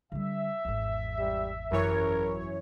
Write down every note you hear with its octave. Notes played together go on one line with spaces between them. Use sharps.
D3 G3 E5
G#1 E2
G3
F#2 E3 A#4 C#5